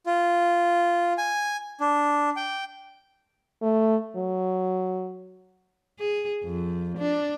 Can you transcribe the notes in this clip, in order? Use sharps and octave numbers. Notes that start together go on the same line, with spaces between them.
F4
G#5
D4
G5
A3
F#3
G#4
F2
D4